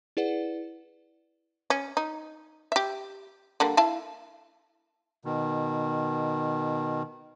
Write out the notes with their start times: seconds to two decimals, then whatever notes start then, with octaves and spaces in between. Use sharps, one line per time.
0.17 E4 G#4 B4 D5 F#5
1.70 C#4
1.97 D#4
2.72 G4 E5
3.60 D3 G3 A#3
3.77 E4 F5 A5
5.25 B2 D#3